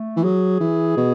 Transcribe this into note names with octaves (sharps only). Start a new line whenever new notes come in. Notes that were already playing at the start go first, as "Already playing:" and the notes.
Already playing: A3
E3
F#3 G#4
E3
B2